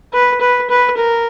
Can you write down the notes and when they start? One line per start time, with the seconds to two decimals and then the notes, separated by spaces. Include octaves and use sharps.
0.13 B4
0.41 B4
0.70 B4
0.97 A#4